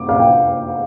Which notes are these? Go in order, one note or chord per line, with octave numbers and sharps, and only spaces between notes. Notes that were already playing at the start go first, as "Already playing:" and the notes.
Already playing: D6
F5
G5